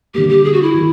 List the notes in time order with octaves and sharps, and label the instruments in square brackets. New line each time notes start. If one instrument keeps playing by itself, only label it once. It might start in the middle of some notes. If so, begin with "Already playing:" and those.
[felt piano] D3 G3 A#3 [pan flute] G4
[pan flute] G4
G#4
F#4
E4
[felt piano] D#3 F#3